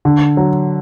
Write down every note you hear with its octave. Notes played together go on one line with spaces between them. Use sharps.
D3
F#3